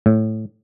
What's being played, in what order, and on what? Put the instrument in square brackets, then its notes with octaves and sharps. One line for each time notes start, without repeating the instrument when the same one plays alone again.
[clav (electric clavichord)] A2